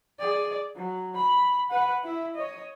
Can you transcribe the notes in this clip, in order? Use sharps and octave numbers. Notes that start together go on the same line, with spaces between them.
G#4 D5
F#3
B5
B4 F#5
E4 E5
C#5 D#5